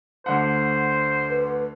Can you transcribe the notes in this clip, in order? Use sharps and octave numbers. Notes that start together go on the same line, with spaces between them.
D2 D3 C5 F#5
B4